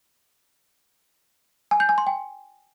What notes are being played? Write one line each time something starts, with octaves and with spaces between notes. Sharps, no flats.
G#5
G6
G#5
C6
G5